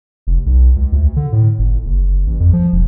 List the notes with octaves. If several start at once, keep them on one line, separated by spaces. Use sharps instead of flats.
F1
B1
C#2
D2
D3
A2
G1
F#1
A1
F2
F3
E1